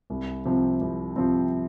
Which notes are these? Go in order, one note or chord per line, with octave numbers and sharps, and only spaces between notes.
C2
C3 F3 C4
C2
C3 F3 C4